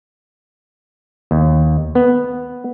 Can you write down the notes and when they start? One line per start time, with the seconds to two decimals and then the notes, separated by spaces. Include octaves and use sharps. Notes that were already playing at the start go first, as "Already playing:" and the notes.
1.31 D#2
1.95 B3